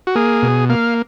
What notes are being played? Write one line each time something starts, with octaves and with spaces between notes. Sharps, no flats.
F#4
A#3 G#4
B2
A#3 F5